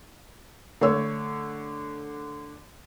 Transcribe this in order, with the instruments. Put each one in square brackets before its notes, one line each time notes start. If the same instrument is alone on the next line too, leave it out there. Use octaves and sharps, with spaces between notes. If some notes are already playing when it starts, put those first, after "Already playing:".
[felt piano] D3 A3 C#5 E6